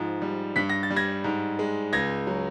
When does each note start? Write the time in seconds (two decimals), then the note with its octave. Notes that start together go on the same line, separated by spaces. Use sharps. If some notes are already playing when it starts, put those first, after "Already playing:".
Already playing: G#2 F3
0.22 G3
0.56 G2 B6
0.69 A#6
0.83 A6
0.90 G3
0.96 G#6 A#6
1.24 G#2
1.59 G#3
1.93 C#2 G#6 A#6
2.27 F#3